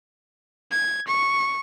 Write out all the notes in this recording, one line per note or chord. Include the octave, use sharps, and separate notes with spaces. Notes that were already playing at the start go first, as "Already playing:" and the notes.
G#6
C#6